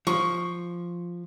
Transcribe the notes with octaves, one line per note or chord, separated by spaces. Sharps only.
F3 C#6